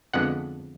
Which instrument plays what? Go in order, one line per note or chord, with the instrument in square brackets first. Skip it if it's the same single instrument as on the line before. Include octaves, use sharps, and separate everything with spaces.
[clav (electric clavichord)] F2 D3 G#3 B3 F#5